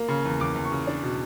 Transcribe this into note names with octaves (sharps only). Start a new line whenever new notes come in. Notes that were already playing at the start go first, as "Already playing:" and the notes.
Already playing: A#3
C#3
E2
E2 D6
E2
C#6
C#3
D4
B2